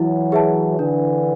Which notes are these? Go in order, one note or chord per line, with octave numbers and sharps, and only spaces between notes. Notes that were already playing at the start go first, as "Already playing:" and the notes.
Already playing: E3 F#3 E4
G#4 B4 E5 A5
D3 E3 D4